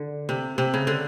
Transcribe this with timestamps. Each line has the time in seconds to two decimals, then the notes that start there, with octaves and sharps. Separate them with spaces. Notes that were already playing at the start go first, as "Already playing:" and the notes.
Already playing: D3
0.29 C3
0.58 C3
0.74 C#3
0.87 D3